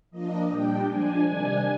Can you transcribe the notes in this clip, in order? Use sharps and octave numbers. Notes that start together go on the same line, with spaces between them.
F3 A#3 D4 D#5
A#2 G3 D4 G5
F3 G#3 D4 G#5
C3 D#3 G3 D4